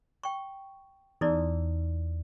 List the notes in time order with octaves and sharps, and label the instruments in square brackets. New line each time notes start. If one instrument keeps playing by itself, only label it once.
[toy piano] G5 C#6
[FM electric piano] E2 [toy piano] D#4 E4 D5